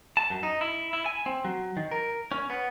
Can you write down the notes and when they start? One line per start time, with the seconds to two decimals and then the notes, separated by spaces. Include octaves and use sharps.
0.17 A5
0.30 F#2
0.43 D#4
0.61 E4
0.93 E4
1.06 G#5
1.26 C4
1.45 F#3
1.77 D#3
1.91 A#4
2.32 C#4
2.50 B3